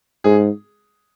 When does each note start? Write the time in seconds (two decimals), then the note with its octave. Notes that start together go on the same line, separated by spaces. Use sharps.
0.24 G#2 G#4